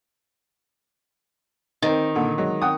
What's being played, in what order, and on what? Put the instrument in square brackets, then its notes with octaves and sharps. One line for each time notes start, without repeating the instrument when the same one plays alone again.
[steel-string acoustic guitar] D#3 [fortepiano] C4 D#4
[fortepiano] A#2 D3
F#3 G#3
F#5 G5 D#6